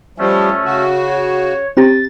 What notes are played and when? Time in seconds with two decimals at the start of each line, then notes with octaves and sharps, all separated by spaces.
0.18 F3 G3 A3 C#4
0.65 C#3 F#4
1.08 C#5
1.77 C4 G4 A#5 A6